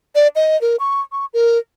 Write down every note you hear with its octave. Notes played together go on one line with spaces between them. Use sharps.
D5
D#5
A#4
C#6
C#6
A#4